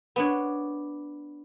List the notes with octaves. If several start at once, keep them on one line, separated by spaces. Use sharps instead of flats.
B3 D4 C#5